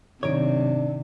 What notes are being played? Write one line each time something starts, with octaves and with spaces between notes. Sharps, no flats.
B1 G#2 C3 D#3 D4 D#4 C#5 D7